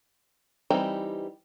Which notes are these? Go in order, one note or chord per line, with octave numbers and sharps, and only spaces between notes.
E3 G3 C4 D#4 G4